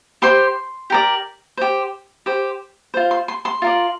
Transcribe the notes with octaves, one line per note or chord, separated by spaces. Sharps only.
G4 C5 C6
G4 A#4 D5
G4 C5
G4 C5
F4 C5
C6
C6
C6
F4 A#4 D5